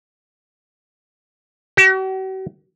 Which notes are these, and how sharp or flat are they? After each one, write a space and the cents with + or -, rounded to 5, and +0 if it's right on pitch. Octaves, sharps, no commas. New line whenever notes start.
F#4 +45